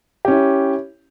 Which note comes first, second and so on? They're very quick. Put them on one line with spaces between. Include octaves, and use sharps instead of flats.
G4 C#4 E4